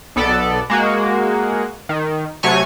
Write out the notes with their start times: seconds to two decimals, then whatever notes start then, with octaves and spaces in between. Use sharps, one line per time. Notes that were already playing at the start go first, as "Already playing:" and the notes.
0.16 B1 B3 A4 D5
0.70 G#3 A#3 F#4
1.89 D#3
2.43 C3 F#3 A3 C#5 G#5 C#6